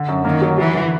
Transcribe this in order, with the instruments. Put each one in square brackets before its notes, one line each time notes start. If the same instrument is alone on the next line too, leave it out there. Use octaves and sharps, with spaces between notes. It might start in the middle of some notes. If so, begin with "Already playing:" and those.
Already playing: [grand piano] D3
F#2
[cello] D#3 [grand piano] A#3
[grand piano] F#3
[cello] E3 [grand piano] F#3
[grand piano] D3